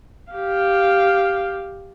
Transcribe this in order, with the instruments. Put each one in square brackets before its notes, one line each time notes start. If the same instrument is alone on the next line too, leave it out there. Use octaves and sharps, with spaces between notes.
[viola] G4 F5